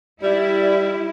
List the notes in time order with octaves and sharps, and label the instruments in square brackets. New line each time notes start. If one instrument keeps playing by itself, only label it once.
[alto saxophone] G3 [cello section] E4 [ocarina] D5